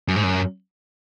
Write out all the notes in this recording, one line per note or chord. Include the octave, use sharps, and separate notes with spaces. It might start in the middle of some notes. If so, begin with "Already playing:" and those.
F#2
G#2
F#2